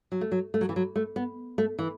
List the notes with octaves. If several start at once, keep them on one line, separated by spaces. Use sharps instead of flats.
F#3
A3
F#3
A3
F#3
E3
F#3
A3
B3
A3
E3